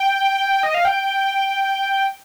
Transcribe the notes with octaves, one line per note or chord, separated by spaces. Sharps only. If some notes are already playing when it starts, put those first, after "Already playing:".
Already playing: G5
D#5
F5
G5